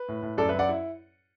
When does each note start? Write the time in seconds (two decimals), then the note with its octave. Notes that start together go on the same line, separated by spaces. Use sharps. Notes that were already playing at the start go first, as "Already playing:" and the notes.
Already playing: B4
0.08 A2
0.22 A2
0.38 F#2 A4 D5
0.49 B4 E5
0.54 F#2
0.59 D5 F#5
0.69 E4